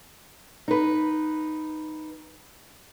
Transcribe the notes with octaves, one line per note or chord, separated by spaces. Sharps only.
D#4 B4